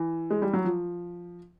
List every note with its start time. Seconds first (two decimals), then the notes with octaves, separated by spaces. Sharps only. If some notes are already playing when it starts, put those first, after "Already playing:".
Already playing: E3
0.30 G#3
0.42 G3
0.54 F#3
0.65 F3